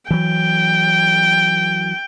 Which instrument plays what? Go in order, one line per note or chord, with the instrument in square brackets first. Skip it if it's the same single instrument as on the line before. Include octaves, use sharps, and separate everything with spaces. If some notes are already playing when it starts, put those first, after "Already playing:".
[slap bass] E3 F#3 [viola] G5